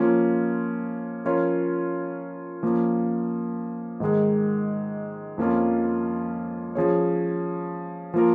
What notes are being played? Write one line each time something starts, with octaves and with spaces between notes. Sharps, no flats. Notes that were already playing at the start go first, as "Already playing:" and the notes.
Already playing: F3 A#3 C#4 F4
F3 C#4 F4 A#4 C#5
F3 A#3 C#4
G#2 D#3 G#3
F2 F3 A#3 C#4 F4
F3 C#4 G#4 C#5
F3 A#3 F4 A#4